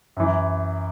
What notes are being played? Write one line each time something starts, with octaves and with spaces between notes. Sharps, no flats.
F#2 E3